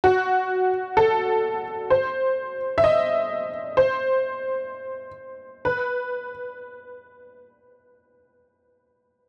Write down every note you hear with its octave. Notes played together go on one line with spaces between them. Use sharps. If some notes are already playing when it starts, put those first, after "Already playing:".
F#4
A4
C5
E5
D#5
C5
B4